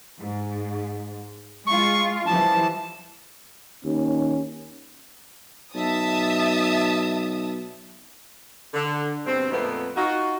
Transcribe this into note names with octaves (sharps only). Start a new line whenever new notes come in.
G#2
G#3 F4 C#6
E3 F3 G3 A5
D#2 C#4
B1 E5 A5 D#6
D3
G2 B2 C4
F2 A#2 A3 B3
D#4 F4 F#4